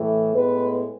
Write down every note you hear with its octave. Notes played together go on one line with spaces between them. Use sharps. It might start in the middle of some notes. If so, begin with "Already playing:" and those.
Already playing: A2 E3 A3
A2 G#3 B3 B4